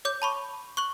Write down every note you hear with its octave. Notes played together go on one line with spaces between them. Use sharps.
C#5 D6 G6
A5 B5 C#6
C#6 F#6 F#7